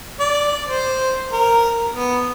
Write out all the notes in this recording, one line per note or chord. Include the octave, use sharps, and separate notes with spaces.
D5
C5
A#4
B3